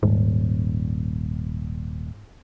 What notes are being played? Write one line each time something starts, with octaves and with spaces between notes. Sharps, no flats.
D#1 G#2